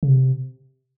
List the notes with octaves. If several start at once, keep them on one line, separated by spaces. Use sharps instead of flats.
C#3
C3